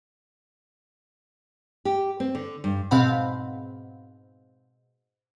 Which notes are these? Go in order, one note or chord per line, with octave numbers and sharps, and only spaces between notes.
G4
C4
D3
G2
G#2 B2 C4 F5 F#5 B5